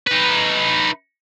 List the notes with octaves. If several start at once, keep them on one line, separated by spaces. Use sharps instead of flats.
D#4 B4